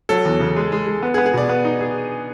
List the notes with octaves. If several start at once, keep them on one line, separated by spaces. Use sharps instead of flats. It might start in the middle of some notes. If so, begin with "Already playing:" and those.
F#3 A4
E2
C#3
G#3
G#3
G#3
B3
G#4
B3
G#4
B2 D5
B3
D#4
G#4